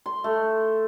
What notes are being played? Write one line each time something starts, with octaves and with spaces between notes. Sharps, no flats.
C6
A3